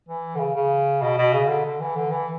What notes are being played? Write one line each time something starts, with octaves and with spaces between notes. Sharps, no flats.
E3
D3
C#3
C#3
B2
B2
C#3
D3
D3
E3
D3
E3